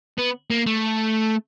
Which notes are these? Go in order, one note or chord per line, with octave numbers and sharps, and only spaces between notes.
B3
A#3
A3